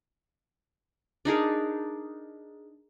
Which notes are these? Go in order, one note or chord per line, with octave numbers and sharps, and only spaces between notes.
D4 D#4 G#4 A#4